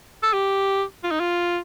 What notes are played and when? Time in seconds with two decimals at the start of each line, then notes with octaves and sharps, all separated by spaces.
0.23 A4
0.33 G4
1.04 F4
1.11 D#4
1.20 F4